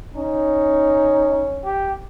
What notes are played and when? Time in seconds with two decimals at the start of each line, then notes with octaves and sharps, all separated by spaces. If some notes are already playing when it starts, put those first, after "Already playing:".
0.16 C#4 D#4
1.64 G4